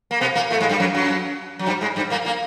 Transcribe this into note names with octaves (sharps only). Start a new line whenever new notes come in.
A#3
B2 B3
A#2 A#3
A2 A3
G#2 G#3
G2 G3
F#2 F#3
F#2 F#3
F#3
G2 G3
G#2 G#3
G2 G3
A#2 A#3
A#2 A#3